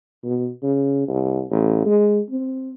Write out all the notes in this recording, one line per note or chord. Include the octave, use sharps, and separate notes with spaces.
B2
C#3
C2
A1
G#3
C4